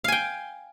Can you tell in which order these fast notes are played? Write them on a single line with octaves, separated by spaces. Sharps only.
F5 G#5 G5